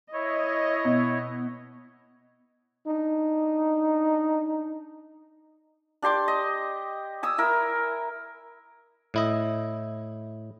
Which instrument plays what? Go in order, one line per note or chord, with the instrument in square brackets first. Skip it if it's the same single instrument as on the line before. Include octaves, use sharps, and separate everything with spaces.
[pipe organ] E4 C#5 [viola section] D#5
[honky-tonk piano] B2
[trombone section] D4 D#4
[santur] D4 G4 C6 D6
D#5
G#5 D#6 E6
E4 A#4
[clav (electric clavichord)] A2 E4 D#5